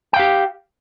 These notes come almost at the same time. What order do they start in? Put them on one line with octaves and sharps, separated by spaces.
G5 F5 G4